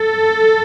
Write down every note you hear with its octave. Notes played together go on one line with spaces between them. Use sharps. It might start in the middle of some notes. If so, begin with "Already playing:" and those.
Already playing: A4